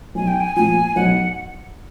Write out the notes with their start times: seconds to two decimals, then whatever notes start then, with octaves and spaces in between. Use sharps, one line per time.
0.15 B1 G#5
0.28 G5
0.41 G#5
0.56 A#2 F3 G#5
0.96 B1 F#5